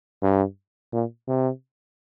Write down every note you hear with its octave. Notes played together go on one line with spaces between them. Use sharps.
G2
A#2
C3